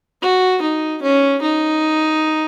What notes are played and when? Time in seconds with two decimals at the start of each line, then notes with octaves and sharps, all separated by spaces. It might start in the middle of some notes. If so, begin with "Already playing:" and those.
0.22 F#4
0.62 D#4
1.02 C#4
1.42 D#4